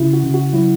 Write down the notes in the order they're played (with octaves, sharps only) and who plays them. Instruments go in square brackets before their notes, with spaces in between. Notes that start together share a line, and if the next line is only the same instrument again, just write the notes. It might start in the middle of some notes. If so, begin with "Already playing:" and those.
Already playing: [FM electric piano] C#3 E4
F#4
C#3
F#4
F#3 E4